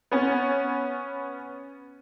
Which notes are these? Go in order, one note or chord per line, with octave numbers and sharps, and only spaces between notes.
B3 C#4